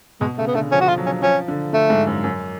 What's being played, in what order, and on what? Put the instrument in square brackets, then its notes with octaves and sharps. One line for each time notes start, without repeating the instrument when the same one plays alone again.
[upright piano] B2 [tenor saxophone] G#3
[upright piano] C#3 [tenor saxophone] A3
[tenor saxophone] B3
[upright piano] D3 [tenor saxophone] A3
[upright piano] F3 [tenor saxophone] C#4
[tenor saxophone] F#4
F4
[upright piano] F#3
[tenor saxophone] C#4
[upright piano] F3 [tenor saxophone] C#4
[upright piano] D3
[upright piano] D3 [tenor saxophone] A3
[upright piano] G#2
F#2
F#2